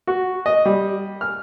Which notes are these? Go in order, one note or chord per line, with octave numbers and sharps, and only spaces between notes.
F#4
D#5
G3
F6